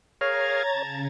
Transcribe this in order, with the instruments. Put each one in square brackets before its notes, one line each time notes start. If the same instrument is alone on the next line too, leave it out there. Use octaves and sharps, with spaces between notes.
[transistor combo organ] G#4 A#4 F5 [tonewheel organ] C#5 [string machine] A#5 G#6 A6
[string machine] C#3 [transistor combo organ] A5